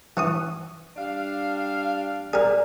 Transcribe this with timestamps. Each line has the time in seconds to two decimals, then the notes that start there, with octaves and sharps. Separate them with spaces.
0.17 E3 C#6 D#6
0.97 G3 D4 F5
2.33 G#4 A#4 D5